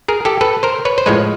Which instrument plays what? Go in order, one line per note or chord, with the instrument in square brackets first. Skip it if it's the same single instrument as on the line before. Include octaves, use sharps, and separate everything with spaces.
[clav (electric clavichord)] G#4 A#4
G4 A4
A4 B4
A#4 C5
B4 C#5
C5
A2 F3 G#3 B4 C#5